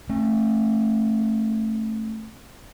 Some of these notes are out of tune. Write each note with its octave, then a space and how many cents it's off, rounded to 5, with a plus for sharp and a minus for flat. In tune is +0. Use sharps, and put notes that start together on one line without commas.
A3 +0 C#4 -45